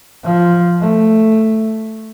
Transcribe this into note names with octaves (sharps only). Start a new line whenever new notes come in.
F3
A3